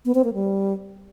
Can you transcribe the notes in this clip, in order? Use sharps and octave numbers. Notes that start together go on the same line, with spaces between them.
B3
C4
A#3
G3